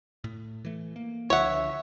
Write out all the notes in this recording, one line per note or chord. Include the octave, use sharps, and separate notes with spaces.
A2
E3 A3
A#3
C#2 D3 F3 C#5 E5 F#5